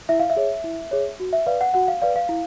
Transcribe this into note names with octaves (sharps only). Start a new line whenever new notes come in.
E4 E5
F5
E5
G#4 C#5
E4
G#4 C#5
F#4
E5
B4 D5 F5
F#5
F#4 F#5
F5
B4 D5 F5
F5
E4